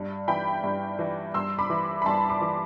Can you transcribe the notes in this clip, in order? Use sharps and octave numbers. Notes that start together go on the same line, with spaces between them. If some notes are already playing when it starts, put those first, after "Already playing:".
Already playing: G2
E3 G5 B5
G2
E3
G2 C6 E6
B5 D6
E3
B5
G2 A5 C6
B5 D6
E3